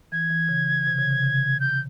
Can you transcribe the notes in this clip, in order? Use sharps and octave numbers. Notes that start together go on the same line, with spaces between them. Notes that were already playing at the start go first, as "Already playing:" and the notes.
E3 G#6
E3
C#3
C3
C#3
C3
C#3
G6